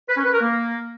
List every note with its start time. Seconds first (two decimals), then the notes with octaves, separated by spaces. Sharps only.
0.09 B4
0.17 C#4
0.25 B4
0.33 A#4
0.41 A#3